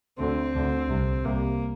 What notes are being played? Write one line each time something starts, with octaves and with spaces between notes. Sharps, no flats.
D2 D3 C4
D2 D3
C2 C3
C2 C3 A#3